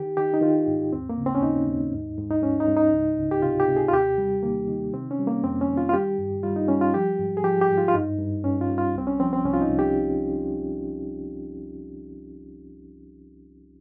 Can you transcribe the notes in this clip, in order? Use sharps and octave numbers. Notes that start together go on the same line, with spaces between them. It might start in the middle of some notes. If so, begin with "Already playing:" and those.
Already playing: D#3 G4
D#3 G4
D#4
D#3 F4
G#2
D#2 C4
A#3
C#3
C4
C#4
D#2 D#4
D#2
G#2
G#2
D#4
G#2 C#4
D#4
G#2
D#4
C#2
C#2
G4
C3 F4
G4
C3
G#4
F4
D#2 G4
G3
D#3 A#3
D#3
C3 C4
C#4
G3
A#3
F2 C4
C#4
D#3
F4
F4
G3 G4
G2
G3 F4
D#4
G3 C#4
F4
F3 G4
G#2
G#4
F3 G4
G4
G#2
F4
F4
G2 D#4
G2
G2 C#4
F4
G3
F4
C2 C4
C#4
F3 C4
C4
C2 C#4
F4
D#4
C2
G4